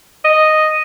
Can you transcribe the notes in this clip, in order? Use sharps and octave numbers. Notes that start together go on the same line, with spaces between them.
D#5